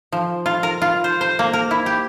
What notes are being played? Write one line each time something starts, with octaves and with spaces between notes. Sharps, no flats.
F3
F4
A#4
F4
C5
C5
A#3
A#4
E4
G4